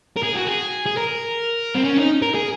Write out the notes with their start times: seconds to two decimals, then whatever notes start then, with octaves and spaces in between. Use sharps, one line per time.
0.16 A#4
0.23 G#4
0.35 F#4
0.47 G#4
0.86 G#4
0.97 A#4
1.75 C4
1.84 C#4
1.97 D#4
2.22 A#4
2.35 G#4